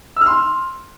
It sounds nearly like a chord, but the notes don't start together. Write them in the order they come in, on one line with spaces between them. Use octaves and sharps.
E6 F6 C6